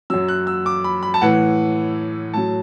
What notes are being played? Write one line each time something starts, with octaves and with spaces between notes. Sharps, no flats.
F#2 F#3 E6
F#6
E6
D6
B5
B5
A5
A2 E3 F#5
A2 F#3 A5